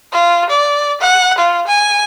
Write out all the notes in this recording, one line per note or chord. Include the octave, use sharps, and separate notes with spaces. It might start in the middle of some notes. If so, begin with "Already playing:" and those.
F4
D5
F#5
F4
G#5